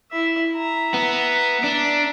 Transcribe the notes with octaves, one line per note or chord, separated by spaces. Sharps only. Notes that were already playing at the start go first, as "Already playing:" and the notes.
E4 E5
E5 A#5
B3
D4